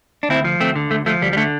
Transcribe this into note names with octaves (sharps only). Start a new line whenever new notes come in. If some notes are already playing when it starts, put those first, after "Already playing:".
D4
D2 C4 E4
F3
D2 A3 C4
D3
D2 A3
F3 A3
D2 G3
G3
D3 A3